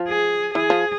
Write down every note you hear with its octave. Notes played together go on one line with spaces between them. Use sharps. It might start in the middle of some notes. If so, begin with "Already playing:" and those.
Already playing: F3
G#4
E3 G#4
F3